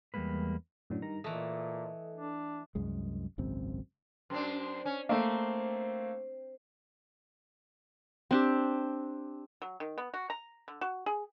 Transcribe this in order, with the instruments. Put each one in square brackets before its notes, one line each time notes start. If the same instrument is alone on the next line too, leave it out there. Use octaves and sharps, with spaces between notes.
[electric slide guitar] E2 G3 G#3 A#3 B4
[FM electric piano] F#2 A2 D3
G2 D#3 A#5
[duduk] A#2 [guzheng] E3 A3 [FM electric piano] A4 D#5
[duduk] D4
[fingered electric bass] C2 F#2 G#3
G#1 C#2 F#2 C4
[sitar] F#2 C4 D4
C#4
[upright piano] A3 A#3 [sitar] C4
[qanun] C4 D4 G4
[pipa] F#3
D#3
B3
F#4
A#5
D3
F#4
G#4